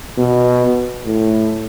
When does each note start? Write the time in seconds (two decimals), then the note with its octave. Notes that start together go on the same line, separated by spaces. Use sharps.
0.18 B2
1.06 A2